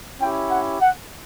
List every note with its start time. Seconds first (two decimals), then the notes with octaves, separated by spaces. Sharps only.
0.20 C#4 E4 G4 G5
0.51 F#5
0.81 F#5